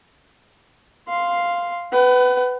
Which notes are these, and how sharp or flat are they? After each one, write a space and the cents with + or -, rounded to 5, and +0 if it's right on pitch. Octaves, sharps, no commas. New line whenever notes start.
F5 +0 C6 +0
B4 +15 F#5 +40